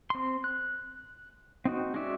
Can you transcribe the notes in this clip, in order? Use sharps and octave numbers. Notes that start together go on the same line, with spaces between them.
C4 C6
F#6
C4 D#4 F#4
G#3 C#4 F#4 D5 E5